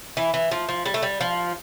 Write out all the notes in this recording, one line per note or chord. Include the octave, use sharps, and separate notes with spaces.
E3
E3
F3
F3
G3
A3
G3
F3